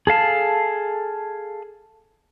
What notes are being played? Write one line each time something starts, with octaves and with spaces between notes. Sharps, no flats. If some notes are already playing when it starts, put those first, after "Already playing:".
G#4 A4 F5 A5